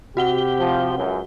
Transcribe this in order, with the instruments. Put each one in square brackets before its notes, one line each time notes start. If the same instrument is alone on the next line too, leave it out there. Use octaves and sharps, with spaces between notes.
[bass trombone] C3 [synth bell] F#4 F#5 G7 [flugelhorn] G4
[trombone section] F3
C#2 F#2